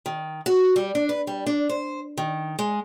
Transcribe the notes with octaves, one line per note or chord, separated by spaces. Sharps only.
D#3
F#4
G3
D4
B4
G3
D4
C5
D#3
G#3